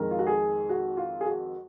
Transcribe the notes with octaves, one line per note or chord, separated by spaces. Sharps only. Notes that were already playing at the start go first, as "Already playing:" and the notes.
Already playing: F2 D#3 G#3 A#4
F4
F#4
G#4
F#4
F4
G#4
F#4